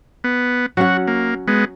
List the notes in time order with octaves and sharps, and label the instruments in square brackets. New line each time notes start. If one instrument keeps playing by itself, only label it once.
[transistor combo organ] B3
[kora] F#3 C#4 F#5 [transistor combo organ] F#4
[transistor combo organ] A#3
G#3 B3